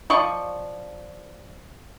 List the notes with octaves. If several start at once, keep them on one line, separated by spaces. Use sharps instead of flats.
F3 D5 D#5 C#6